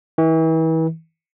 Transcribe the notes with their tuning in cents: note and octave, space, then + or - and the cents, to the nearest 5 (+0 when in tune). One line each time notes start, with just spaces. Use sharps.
E3 -35